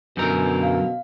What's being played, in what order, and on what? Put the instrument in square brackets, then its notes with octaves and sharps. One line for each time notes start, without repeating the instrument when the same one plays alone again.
[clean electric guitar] F#2 D3 A#4 [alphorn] B2 [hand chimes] G6
[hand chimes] F5